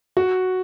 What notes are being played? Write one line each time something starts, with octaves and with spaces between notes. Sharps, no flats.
F#4